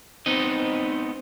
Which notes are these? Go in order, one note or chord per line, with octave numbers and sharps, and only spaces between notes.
B3 C4 D#4 D#5